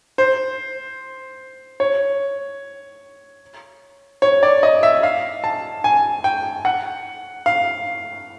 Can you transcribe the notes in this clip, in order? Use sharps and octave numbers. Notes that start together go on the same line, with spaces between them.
C5
C#5
C#5
D5
D#5
E5
F5
A5
G#5
G5
F#5
F5